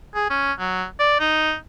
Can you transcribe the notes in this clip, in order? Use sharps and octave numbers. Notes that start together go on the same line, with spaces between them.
G#4
C#4
F#3
D5
D#4